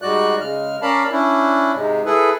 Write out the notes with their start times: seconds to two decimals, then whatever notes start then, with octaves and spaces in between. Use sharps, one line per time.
0.02 G#2 G3 G#3 F#4 D5 F#6
0.41 C#3 G#3 F6
0.82 C#4 A#4 D5 F5 A5 B5
1.11 C#4 D4 E4
1.75 G#2 C3 G#3
2.06 E4 G#4 A4 B4